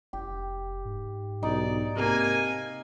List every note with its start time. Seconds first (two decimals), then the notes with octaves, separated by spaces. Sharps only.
0.13 F1 G4
0.85 G#2
1.43 B1 D#4 D5
1.96 C3 A#3 G#5